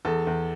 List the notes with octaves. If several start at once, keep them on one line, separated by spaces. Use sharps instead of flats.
E2 A4
E2